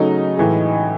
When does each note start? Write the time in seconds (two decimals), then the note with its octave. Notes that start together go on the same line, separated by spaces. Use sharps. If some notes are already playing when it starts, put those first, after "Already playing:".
Already playing: C#3 F#3 A3 D#4
0.37 A2 E3 G#3